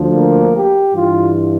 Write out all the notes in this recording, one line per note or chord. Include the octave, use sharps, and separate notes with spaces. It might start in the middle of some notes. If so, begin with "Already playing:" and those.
Already playing: D2 D3 F3
A#3
G4
G2 E3 F4